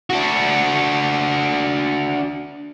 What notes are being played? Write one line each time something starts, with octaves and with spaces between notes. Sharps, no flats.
D4 F#4